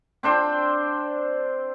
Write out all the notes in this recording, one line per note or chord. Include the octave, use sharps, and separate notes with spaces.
C4 D4 C5 G5